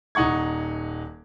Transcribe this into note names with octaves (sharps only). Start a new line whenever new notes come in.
D#1 D#4 F#5 C#6 G#6